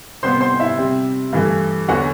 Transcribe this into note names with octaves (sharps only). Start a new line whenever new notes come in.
C3 G3 B3 C5 C6
C5 C6
E4 E5
C3 G3 C4
G2 E3 A3
E2 D3 F#3 F#4 F#5